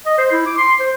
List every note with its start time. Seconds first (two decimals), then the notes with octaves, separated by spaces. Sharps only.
0.06 D#5
0.18 C5
0.32 E4
0.46 D6
0.58 C6
0.79 C5